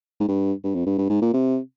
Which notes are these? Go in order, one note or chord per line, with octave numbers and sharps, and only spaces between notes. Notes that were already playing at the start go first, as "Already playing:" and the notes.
G#2
G2
G2
F2
G2
G2
G#2
A#2
C3